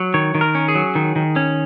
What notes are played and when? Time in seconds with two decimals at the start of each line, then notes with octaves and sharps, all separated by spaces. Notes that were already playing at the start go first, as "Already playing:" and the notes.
Already playing: F#3
0.14 D#3 C#5
0.35 D#3
0.41 A#4
0.55 C#4
0.68 G#4
0.75 F#3
0.95 D#3
1.16 D#3
1.36 C#4